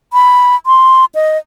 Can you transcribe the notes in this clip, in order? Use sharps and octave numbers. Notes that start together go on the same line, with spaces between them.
B5
C6
D#5